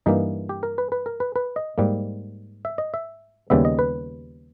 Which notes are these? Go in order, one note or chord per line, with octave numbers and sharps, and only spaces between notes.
G2 E3 A#3 D#4
G4
A#4
B4
B4
A#4
B4
B4
D#5
G#2 G3 A#3
E5
D#5
E5
D#2 C#3 G3 B3 E5
D#5
B4